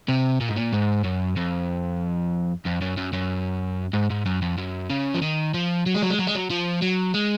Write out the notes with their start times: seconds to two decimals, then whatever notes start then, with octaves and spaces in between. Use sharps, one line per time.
0.08 C3
0.40 A#2
0.48 G#2
0.56 A#2
0.73 G#2
1.05 F#2
1.37 F2
2.65 F2
2.81 F#2
2.97 F#2
3.13 F#2
3.93 G#2
4.10 G#2
4.26 F#2
4.42 F2
4.58 F#2
4.89 C#3
5.14 F3
5.22 D#3
5.54 F3
5.86 F#3
5.94 G#3
6.02 F#3
6.10 G#3
6.19 F#3
6.27 G#3
6.35 F#3
6.50 F3
6.82 F#3
7.14 G#3